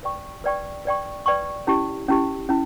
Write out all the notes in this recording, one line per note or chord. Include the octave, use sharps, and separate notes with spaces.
B4 D5 G5 C#6
B4 D5 G5 C#6
B4 D5 G5 C#6
B4 D5 G5 C#6
C#4 E4 G4
C#4 E4 G4
C#4 E4